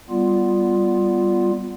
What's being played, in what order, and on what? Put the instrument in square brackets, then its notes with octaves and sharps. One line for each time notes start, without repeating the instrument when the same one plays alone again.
[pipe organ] G3 B3 F4